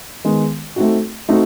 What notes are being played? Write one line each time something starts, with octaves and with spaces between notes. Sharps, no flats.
D#3 G#3 B3
A3 C4 D#4 F#4
A3 C4 D#4 F#4